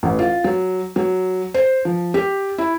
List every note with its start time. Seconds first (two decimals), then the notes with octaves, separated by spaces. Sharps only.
0.03 A1
0.19 F4
0.44 F#3
0.96 F#3
1.54 C5
1.85 F3
2.14 G4
2.58 E4